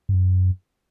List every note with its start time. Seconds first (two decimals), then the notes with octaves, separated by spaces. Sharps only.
0.09 G2
0.14 F#2